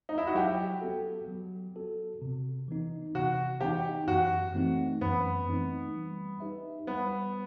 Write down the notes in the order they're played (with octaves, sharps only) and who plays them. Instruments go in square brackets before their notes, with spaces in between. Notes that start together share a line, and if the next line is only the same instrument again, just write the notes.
[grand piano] D#4
E4
F#4
[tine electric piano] F#3 [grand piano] G4
[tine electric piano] B3 F#4 A4
F#3
B3 F#4 A4
C3
E3 B3 D#4
[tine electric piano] C3 [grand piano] F#4
[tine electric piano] E3 B3 D#4 [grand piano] G4
[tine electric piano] F#2 [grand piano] F#4
[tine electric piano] E3 A3 C4 D#4
[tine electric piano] F#2 [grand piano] B3
[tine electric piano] E3 A3 C4 D#4
G3
D#4 G4 B4 E5
[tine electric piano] G3 [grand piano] B3